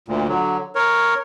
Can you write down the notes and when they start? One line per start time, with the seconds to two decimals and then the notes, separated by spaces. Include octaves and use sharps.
0.08 D2 A#2
0.28 D3 F#3
0.75 A#4 C#5